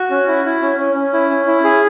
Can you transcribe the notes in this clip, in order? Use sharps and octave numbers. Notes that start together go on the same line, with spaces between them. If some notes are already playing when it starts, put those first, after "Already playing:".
Already playing: F#4
C#4
E4
E4
C#4
C#4
C#4
E4
C#4
E4
G#4